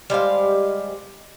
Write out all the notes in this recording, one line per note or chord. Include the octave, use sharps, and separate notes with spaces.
G3 G#3 C5 F5